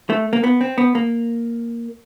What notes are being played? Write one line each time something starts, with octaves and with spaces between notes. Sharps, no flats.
A3
A#3
B3
C4
B3
A#3